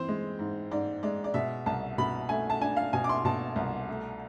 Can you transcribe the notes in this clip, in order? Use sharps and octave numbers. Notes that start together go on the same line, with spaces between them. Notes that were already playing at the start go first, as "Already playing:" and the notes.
Already playing: E3 C4 C5
G#3
G#2
G#2 D5
G#3 D5
D5
B2 E5
C2 A5
B2 B5
A3 G#5
A5
D4 G#5
F5
B2 G#5
D6
C6
B2 A5
C2
A3